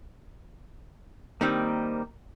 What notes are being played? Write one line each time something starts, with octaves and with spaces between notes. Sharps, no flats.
D#3 G3 A#3 C4 D#5